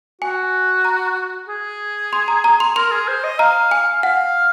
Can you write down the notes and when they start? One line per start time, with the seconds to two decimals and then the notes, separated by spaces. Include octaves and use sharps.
0.22 F#4 G#5
0.85 A#5
1.48 G#4
2.13 C6
2.28 A#5
2.44 A#5
2.60 C6
2.76 A#4 C6
2.92 G#4
3.08 C5
3.24 D#5
3.39 F5 A#5
3.71 G#5
4.03 F5 F#5